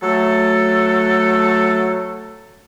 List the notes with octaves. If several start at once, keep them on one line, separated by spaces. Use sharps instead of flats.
F#3 A3 A4